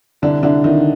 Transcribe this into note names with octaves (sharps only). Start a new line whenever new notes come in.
C2 D3 D4
C2 D3 D4
C2 D#3 D#4